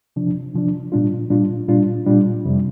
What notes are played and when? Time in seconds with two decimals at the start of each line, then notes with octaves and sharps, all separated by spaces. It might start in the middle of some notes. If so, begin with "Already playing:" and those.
0.16 C3 F3 D4
0.54 C3 F3 D4
0.92 A#2 G3 D4 F4
1.30 A#2 G3 D4 F4
1.68 A#2 G3 D4 F4
2.06 A#2 G3 D4 F4
2.45 F2 C3 G3